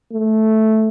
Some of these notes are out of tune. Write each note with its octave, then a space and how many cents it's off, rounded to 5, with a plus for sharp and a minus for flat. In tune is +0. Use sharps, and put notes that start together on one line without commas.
A3 -5